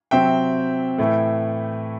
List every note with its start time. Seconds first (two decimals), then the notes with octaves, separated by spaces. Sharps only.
0.11 C3 F#3 C4 E5 G5
0.98 A2 E3 A3 E4